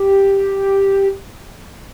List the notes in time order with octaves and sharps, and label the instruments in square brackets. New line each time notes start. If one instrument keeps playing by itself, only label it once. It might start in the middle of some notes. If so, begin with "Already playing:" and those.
Already playing: [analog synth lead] G4